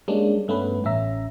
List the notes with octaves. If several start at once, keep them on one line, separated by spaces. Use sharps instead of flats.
G3 G#3 A#3 C#4 D4
G2 A3 B3 C#4 B4
A1 C#4 E5 A#5